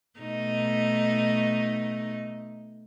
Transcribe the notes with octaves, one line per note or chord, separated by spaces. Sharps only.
B2 A3 D#4